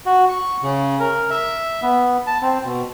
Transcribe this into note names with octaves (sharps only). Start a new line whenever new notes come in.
F#4
C#6
C#3
A#4
E5
B3
A5
C4
B2